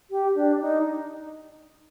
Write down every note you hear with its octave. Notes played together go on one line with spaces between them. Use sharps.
G4
D4
D#4